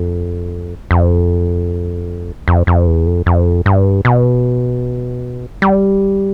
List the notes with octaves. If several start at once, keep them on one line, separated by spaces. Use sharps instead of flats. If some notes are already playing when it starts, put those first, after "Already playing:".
Already playing: F2
F2
F2
F2
E2
F2
F2
G2
B2
G3